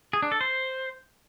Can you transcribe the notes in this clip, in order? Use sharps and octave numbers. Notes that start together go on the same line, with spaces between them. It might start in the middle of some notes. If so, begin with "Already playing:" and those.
G#4
D4
A4
C5